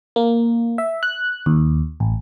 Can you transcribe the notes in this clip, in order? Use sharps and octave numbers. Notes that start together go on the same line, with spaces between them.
A#3
E5
F#6
D#2
A1